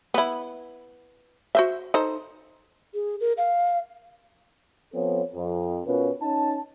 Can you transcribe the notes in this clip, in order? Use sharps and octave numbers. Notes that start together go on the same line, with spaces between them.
B3 E4
F#4 C5 E5
D#4 A4 C5
G#4
A#4
F5
F3 B3 C4 A4 C#5
F2
B2 C#4 F4 A#4 B4
C#4 D#4 A5